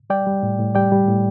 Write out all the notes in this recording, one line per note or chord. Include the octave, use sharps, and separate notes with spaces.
G3 D5 G5
G3
A2
A2
G3 D5 G5
G3
A2